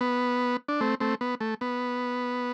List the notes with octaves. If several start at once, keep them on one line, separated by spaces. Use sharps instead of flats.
B3
D4
A3 C4
A3 C4
B3
A3
B3